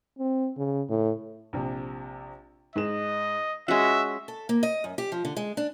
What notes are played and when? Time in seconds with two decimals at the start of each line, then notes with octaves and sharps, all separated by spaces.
0.19 C4
0.57 C#3
0.89 A2
1.53 A#1 C3
2.76 G#2 G#4 D#5 E7
3.68 G#3 C#4 F#4 E5
4.28 A4
4.49 A#3
4.63 D#5
4.84 F#2
4.98 G4
5.12 F3
5.25 D3
5.37 G#3
5.57 D4